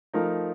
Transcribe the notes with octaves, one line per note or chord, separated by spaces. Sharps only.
F3 A3 D#4 A#4